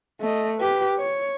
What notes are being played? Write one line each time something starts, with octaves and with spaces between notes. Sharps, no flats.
A3 D#5
G4 B4
C#5